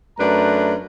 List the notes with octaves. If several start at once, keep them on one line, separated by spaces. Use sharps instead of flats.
F#2 A3 D4 B4 A#5